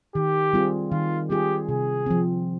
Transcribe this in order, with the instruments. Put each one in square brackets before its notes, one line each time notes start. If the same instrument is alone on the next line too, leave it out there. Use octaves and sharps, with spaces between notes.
[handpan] D#3 [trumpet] G4
[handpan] G3 C4 F4 G#4
[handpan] D#3 [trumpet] F4
[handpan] G3 C4 F4 G#4 [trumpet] G4
[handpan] C3 [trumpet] G#4
[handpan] F3 C4